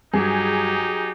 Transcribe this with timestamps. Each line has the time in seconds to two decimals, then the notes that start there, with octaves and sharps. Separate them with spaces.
0.14 G2 F#3 D#4 G4 G#4